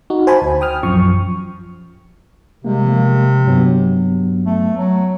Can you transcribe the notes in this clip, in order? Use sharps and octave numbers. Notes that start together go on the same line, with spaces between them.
D#4 F#4
C5 G#5 A5 B5
D2
G5 D#6 F6
A#1 F#2 F3 C#6
C3 G3 G#3 A#3
F3 G#3 A#3
G2 F#3 B3
A3
F#3